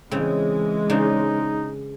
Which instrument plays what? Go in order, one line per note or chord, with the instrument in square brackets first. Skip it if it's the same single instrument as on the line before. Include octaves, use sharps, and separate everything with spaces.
[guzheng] C#3 C4 [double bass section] E3 G#3
[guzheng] C#3 D4 C5 [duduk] D#4